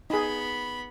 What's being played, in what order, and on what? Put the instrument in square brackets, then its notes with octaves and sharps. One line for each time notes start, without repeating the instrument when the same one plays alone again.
[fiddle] B3 B5 [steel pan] D#4 G#4